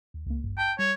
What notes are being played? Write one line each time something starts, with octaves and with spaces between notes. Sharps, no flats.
D#2
C#2 A#3
G#1 G2
G5 A5
G3 C#5